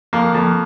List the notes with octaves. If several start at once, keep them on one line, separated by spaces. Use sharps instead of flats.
F2 A#3
F2